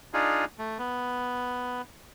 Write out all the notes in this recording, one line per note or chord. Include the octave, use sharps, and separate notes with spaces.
D4 D#4 F4 G#4
A3
B3